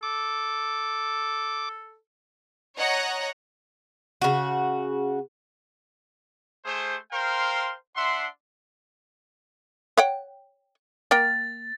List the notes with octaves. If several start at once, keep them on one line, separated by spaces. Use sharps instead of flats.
A4 D6
C#5 D#5 F#5 A#5
C#3 F#4
A3 G#4 C5
A#4 C5 F5 G5 C6
D4 E5 F#5 C6
C#5 F#5 G5
A#3 A#4 G5 A6